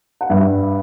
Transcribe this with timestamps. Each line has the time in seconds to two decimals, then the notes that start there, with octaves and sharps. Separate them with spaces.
0.21 F#5
0.30 G2 E5